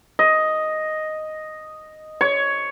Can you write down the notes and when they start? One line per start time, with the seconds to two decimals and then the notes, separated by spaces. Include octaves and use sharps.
0.19 D#5
2.21 C#5